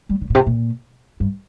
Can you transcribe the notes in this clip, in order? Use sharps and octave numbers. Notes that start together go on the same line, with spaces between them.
G3
D3
A#2
C3
A#2
G2